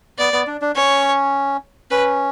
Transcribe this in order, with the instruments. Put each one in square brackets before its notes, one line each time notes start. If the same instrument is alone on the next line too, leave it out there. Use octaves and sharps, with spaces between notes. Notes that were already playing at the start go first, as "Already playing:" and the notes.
[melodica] B3 [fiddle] D5
[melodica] B3
D4
D4
[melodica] C#4 [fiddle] C#5
[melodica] C#4 [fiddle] B4